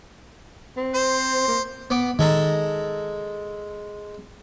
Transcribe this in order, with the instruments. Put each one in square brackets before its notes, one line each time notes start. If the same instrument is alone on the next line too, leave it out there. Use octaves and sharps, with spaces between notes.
[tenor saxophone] C4
[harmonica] C5
[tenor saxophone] A#3
[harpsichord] B3 D6
[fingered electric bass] D#3 [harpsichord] G#3 A4 A#5